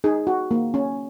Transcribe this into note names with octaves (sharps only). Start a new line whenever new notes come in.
D#4 G#4
F#4
A#3
C#4